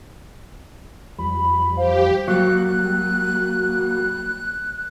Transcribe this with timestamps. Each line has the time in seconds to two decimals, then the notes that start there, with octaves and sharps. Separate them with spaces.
1.19 F2 F3 G3 B5
1.77 G4 C5 F5
2.28 F#3 G3 A#3 F#4 F#6